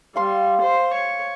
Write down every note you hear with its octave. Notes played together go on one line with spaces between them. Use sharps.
G3 F5 C6
C5
C#5